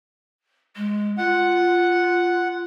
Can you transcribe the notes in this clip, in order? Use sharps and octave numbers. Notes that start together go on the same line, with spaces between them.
G#3
F4 F#5